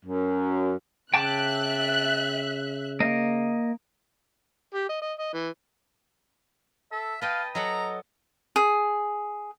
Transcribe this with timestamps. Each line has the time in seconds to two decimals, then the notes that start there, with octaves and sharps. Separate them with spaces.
0.05 F#2
1.14 C#3 E5 G5 A5 D6 F#6
3.00 A#3 D#5
4.74 G4
4.89 D#5
5.02 D#5
5.18 D#5
5.33 E3
6.92 A4 E5
7.21 B4 D#5 F5 G5 A5
7.55 F#3 A4 D#5 F#5 A#5
8.56 G#4